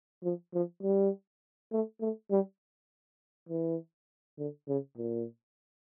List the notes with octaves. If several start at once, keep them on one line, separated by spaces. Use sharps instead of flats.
F3
F3
G3
A3
A3
G3
E3
D3
C#3
A#2